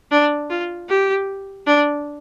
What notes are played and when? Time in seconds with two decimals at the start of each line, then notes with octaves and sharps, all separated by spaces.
0.12 D4
0.50 F4
0.89 G4
1.67 D4